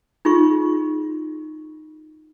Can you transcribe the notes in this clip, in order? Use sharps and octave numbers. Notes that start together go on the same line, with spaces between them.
D#4 F4 G#4 C#6